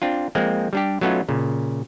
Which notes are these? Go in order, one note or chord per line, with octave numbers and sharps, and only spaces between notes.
C4 D4 F4
F3 G#3 A#3 C4
G3 D4 G4
F#3 A3 B3 C#4 D#4 F4
A#2 C#3